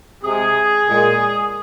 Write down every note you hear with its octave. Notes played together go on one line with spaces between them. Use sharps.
C3 G#3 G#4
A#2 G#3